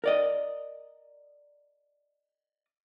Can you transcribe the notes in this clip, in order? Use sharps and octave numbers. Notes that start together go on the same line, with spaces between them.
A#4 D5 D#5